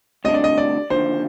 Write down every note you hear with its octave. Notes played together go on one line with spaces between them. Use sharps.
D2 C3 G3 D4 D#5
D5
D#5
D5
D#2 D3 F3 C5